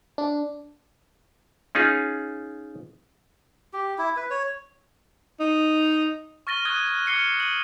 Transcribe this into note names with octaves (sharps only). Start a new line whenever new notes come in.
D4
C#4 D#4 F4 G#4
G4
E4
B4
C#5
D#4
C#6 F6 A6 A#6 D#7 G7
C#6 D#6 F#6 G#6 A6 D#7
D6 F6 G#6 C7 C#7 G7
D#7 F#7